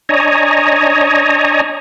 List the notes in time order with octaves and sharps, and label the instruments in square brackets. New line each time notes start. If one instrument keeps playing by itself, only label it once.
[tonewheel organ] D4 C#5 D#5 G#5 A#5